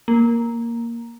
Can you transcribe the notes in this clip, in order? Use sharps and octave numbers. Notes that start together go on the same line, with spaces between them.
A#3